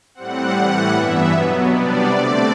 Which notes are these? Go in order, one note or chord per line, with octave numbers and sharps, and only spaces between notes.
A2 G3 C4 F#5
A2 E3 G3 F#5
G2 E3 B3 E5
B2 F#3 B3
C3 G3 B3 D4 D5
D3 A3 C4 D5